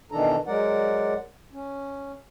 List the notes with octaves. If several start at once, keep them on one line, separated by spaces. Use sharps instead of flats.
B2 D#3 E3 D4 A4 A#5
F#3 G#3 A#4 D5 F#5
C#4